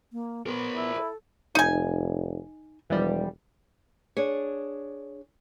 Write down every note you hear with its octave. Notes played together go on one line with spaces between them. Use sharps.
A#3
B3 A#4 C5
E4
A4
F1 D#4 G#5
E1 E3 F3 G3
D4 G#4 C#5